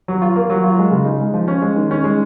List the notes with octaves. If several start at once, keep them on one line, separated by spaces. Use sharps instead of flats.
F#3
F4
A#3
F#3
F4
G#3
C#3
D#4
G#3
F3
C#4
G#3
D#3
C#4
G#3